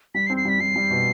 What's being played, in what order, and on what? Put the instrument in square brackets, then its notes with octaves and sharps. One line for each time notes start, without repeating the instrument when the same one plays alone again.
[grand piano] G3 [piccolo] B6
[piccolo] C7
[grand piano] C4
[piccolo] C7
[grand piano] G3 [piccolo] B6
[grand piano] G3 [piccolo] C7
[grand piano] G3
B2